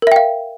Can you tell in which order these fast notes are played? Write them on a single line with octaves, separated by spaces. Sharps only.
A#4 E5 G5 F5